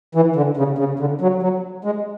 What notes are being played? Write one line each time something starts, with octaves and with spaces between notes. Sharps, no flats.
E3
D3
C#3
C#3
D3
F#3
F#3
G#3